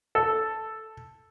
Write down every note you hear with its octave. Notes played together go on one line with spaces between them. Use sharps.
A4